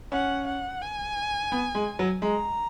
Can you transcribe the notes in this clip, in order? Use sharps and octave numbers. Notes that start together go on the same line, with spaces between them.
C#4 F#5
F#5
G#5
B3
G#3
F#3
G#3 A#5